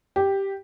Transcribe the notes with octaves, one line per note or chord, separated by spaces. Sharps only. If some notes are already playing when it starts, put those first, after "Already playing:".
G4